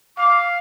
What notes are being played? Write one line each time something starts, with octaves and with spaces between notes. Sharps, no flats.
F5 D6